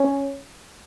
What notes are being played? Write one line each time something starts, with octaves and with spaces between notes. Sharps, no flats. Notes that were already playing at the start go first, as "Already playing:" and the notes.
Already playing: C#4